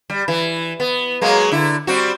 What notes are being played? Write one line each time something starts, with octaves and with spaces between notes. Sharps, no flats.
G3
E3
B3
F#3 G#3 A#3
D3 E4
G3 C4 F#4